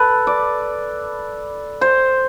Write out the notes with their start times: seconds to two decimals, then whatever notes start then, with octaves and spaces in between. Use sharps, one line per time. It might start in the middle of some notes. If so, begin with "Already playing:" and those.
Already playing: A4 B4
0.27 D5
1.81 C5